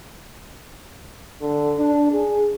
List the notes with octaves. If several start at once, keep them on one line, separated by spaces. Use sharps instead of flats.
D3
D4
G#4